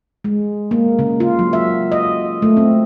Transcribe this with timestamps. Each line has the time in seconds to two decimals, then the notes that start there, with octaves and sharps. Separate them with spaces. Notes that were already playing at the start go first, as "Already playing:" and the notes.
0.24 G#3
0.71 A#3
0.99 C#3
1.20 F4
1.39 F#3
1.53 E5
1.92 D#5
2.42 A3
2.57 C4